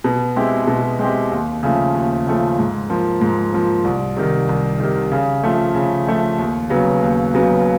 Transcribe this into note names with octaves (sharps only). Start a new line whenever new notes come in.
B2
G#3 C4 E4 G4
B2
G#3 C4 E4 G4
D#2
C#3 F3 A3
D#2
C#3 F3 A3
G#2
F3 A#3
G#2
F3 A#3
C2
C3 D#3
C2
C3 D#3
C#3
F3 A3
C#3
F3 A3
D#2
C#3 F#3 B3
D#2
C#3 F#3 B3